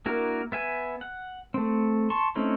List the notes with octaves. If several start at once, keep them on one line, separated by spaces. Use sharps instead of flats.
A#3 D4 E4 F#4 A#4
B3 E5 G#5
F#5
A3 C4
A5 C6 C#6
A3 C4 C#4 D#4 E4